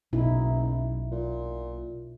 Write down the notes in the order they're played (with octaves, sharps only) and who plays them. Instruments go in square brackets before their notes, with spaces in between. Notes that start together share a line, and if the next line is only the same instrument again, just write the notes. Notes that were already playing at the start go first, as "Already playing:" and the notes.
[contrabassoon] F#1 [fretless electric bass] B1 [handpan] B2 D#4 E4
[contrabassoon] A#2